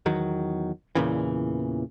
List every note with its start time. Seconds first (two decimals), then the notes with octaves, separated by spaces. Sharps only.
0.06 E2 D#3 F#3
0.95 E2 A#2 C#3 E3